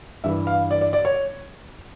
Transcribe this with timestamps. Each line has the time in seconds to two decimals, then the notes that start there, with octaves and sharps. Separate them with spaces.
0.24 G2 E3 E5
0.47 F5
0.71 D5
0.81 D5
0.93 D5
1.05 C#5